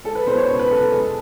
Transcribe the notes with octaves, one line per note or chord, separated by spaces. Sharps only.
G#3 A4
B4
B2 C5
C#5
C#3 C5
B4
C#3 A4
A4
G#3